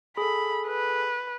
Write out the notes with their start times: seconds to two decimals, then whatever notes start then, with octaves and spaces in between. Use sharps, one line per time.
0.17 G#4 A4 B5
0.67 B4